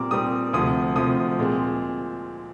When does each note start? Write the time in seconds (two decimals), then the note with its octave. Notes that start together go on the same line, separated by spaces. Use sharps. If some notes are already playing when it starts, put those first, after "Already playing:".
Already playing: A#2 G3 C4 A#5 D6
0.11 A#2 G3 C4 D#6
0.53 D2 C3 F3 D#6
0.96 D2 C3 F3 D#6
1.39 A#2 G#3 C4